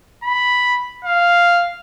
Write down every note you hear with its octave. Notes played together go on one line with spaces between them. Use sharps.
B5
F5